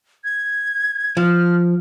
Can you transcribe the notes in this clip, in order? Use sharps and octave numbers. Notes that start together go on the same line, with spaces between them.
G#6
F3 F6